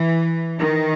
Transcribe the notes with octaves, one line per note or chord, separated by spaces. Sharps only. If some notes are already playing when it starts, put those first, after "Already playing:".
Already playing: E3
D#3